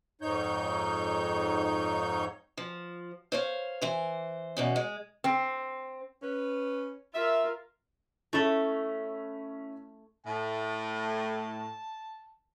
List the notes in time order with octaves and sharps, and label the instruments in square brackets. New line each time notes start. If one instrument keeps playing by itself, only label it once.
[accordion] F2 G#2 D#4 C#5 G6
[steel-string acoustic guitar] F3
C5 C#5 F5
E3 C5
E2 B2 C#4
G#3
[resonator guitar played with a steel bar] C4
[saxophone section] C#4 B4
[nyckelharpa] F4 A#4 [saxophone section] E5
[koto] A3 A4 [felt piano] C#4 E4
[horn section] A2 [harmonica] A5